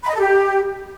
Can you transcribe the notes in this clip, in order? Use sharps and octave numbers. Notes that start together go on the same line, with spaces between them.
B5
D#5
A4
G4